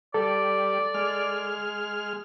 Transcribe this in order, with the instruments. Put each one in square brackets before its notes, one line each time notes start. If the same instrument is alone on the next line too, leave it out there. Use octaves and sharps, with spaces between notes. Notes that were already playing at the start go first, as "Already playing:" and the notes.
[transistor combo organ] G3 [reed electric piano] A4 [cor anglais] D5
[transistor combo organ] G#3 F6